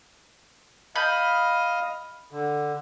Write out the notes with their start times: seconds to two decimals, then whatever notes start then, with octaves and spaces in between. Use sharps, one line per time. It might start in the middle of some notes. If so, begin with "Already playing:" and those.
0.96 D#5 F5 B5 G6
2.32 D3